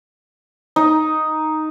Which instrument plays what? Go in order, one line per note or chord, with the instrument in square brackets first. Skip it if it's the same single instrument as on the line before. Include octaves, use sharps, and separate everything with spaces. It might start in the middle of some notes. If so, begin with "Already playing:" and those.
[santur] D#4